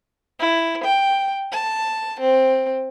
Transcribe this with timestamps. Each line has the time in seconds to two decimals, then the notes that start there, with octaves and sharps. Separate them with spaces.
0.40 E4
0.83 G5
1.52 A5
2.21 C4